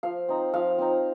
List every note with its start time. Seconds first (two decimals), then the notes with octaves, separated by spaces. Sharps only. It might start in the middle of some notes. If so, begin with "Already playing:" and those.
0.03 F3 F5
0.29 C4 D#4
0.53 F3 F5
0.79 C4 D#4